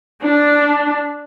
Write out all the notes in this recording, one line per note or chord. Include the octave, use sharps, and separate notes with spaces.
D4